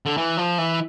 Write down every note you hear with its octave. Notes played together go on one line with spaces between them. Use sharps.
D3
E3
F3
E3